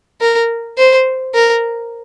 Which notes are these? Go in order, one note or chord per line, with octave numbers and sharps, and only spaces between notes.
A#4
C5
A#4